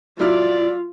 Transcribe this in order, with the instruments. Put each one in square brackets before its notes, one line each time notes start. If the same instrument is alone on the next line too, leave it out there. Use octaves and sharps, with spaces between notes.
[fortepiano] F#3 E4 F6 [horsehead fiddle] F4 [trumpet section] D5